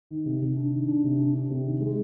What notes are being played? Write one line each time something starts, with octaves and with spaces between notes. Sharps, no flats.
D#3
C3
C3
D4
D#3
D4
C3
D4
D4
C3
D#3
G#3